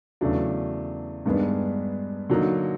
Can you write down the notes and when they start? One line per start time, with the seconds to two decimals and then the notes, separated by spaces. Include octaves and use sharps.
0.21 E2 C#3 F#3 A3 D4
1.26 G2 D#3 G#3 B3 D4
2.29 D3 F#3 A#3 D#4